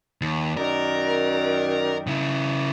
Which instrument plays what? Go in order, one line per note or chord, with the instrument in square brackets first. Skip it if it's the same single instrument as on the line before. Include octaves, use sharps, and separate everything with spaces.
[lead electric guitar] D#2
[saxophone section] F#2 D#3 D5 [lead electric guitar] A#4
[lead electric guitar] C#3 E4